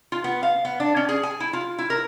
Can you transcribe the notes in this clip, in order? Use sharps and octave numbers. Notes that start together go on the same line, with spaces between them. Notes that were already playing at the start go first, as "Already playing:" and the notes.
F4
B3
F5
B3
D4
C#4
G#4
G#5
E4
F4
E4
A#4